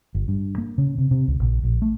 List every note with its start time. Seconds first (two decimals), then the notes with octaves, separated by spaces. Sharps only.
0.15 G1
0.28 G2
0.58 A#3
0.78 C#3
0.98 C3
1.11 C3
1.28 C#2
1.40 A#1
1.63 A#1
1.82 A3